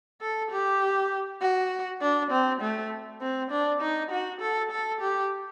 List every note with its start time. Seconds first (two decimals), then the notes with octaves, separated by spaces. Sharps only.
0.21 A4
0.51 G4
1.41 F#4
2.01 D4
2.31 C4
2.61 A3
3.21 C4
3.51 D4
3.81 D#4
4.11 F#4
4.41 A4
4.71 A4
5.01 G4